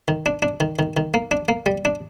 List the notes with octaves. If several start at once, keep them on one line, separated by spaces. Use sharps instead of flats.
D#3
D4
D4
D#3
D#3
D#3
A#3
D4
A#3
G3
D4